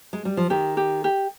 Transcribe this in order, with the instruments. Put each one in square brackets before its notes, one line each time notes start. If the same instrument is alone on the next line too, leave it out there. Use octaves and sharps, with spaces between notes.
[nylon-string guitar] G#3
G3
F3
[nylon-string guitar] D#3 [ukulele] G4
[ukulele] G4
G4